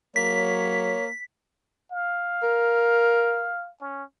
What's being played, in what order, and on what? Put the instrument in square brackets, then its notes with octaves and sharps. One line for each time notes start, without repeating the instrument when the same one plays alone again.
[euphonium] F#3 [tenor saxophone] A#3 [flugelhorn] C#5 [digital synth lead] B6
[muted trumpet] F5
[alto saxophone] A#4
[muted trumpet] C#4